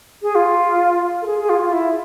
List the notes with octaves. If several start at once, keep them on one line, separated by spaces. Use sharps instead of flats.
G#4
F4
A4
G#4
G#4
F4
F4
E4